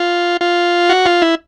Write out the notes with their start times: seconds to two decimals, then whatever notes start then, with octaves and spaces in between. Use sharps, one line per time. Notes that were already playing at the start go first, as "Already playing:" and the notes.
Already playing: F4
0.41 F4
0.90 F#4
1.06 F4
1.22 E4